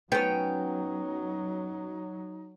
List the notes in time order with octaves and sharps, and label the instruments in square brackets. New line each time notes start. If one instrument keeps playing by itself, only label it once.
[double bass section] F#3 [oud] B3 C#4 [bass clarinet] D#4 [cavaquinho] G5